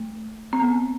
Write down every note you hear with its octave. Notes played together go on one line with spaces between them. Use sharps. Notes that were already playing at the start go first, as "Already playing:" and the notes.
Already playing: A3
C4
B3